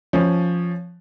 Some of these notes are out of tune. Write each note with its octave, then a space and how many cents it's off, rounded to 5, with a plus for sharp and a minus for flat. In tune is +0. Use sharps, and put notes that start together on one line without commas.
F3 +0 C#4 +0